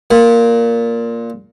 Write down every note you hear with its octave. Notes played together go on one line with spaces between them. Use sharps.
A#2